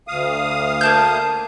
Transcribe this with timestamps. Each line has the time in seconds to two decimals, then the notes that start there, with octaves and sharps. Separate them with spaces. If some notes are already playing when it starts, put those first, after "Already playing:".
0.08 D2 F5 D#6
0.81 A#3 A5 G6